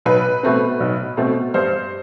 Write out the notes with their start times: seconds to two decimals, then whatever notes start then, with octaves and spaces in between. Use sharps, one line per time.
0.05 B1 B4
0.43 B2 A3 C4
0.80 B1
1.17 B2 A3 C4
1.54 G2 C5